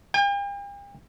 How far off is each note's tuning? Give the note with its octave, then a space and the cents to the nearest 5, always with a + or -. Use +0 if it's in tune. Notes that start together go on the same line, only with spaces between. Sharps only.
G5 +45